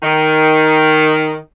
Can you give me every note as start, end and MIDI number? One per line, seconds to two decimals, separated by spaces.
0.01 1.35 51